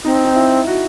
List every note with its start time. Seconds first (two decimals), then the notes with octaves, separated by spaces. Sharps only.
0.05 C4 D#4
0.25 D#4
0.36 E4
0.67 F#4